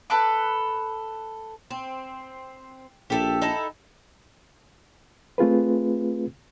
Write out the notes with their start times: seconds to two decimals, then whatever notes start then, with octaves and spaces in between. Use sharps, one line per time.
0.10 A4 B4 D6
1.70 C4
3.10 A#1 G4 A4 E5
3.42 D#4 E4 A4
5.38 A3 C4 F4 G#4 B4